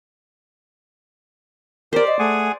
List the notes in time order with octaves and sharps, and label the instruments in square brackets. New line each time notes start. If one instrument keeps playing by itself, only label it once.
[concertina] G4 [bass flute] A#4 [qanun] C5 D5
[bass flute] D#5
[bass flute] A3 [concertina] G#4 F#5 G#5